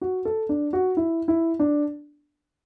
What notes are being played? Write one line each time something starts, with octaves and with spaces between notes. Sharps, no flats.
F#4
A4
D4
F#4
E4
E4
D4